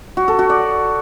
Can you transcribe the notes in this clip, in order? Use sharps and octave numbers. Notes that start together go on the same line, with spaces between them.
F#4
A4
F#4
D5